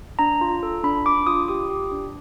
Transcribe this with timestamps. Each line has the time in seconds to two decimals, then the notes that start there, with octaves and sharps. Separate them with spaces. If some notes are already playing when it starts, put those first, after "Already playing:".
0.19 D4 A#5
0.41 F4
0.63 A4
0.83 D4 B5
1.06 D4 D6
1.27 F4 D#6
1.48 G4 D#6
1.70 G4
1.92 D4